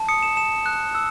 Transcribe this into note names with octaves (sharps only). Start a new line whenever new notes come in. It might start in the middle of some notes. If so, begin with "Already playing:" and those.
Already playing: A5
D#6 C#7
E7
A5 E7
F#6
E6